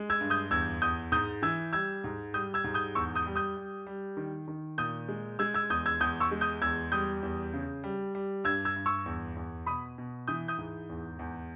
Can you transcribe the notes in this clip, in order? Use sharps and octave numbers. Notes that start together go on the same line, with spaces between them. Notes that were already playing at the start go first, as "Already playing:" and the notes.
Already playing: G#3
E6 G#6
G2
D#6 G6
E2 E6 G#6
E2 D#6 G6
G#2 D#6 G6
E3 E6 G#6
G3 E6 G#6
G#2
G3 D#6 G6
E6 G#6
G#2
D#6 G6
E2 C#6 E6
D#6 G6
G3
D#6 G6
G3
G3
D#3
D#3
A#2 D#6 G6
G#3
G#3 E6 G#6
E6 G#6
E2 D#6 G6
E6 G#6
E2 D#6 G6
C#6 E6
G#3
D#6 G6
E2 E6 G#6
G3 D#6 G6
E2
C#3
G3
G3
G2 E6 G#6
E6 G#6
G2
C#6 E6
E2
E2
B2 B5 D#6
B2
E3 D#6 G6
D#6 G6
G#2
E2
E2